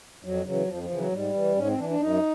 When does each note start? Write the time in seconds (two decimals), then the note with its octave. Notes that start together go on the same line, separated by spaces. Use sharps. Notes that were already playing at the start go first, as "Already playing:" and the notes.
0.24 F2 F#3
0.46 C#3 E3 F#3
0.68 F2 F3
0.83 F3
0.90 C#3 E3
0.98 F#3
1.12 G#2 G3
1.34 E3
1.56 G#2 C#4
1.68 C4
1.78 E3 D4
1.89 D4
2.00 F#2 D#4